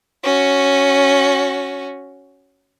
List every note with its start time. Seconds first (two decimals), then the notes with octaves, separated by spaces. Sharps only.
0.24 C#4 F#4